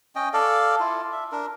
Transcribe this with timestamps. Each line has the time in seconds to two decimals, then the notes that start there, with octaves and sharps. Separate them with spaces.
0.15 C#4 D#5 G5
0.33 A4 D5 F5
0.80 E4 F4
1.12 E5
1.32 D4 A#4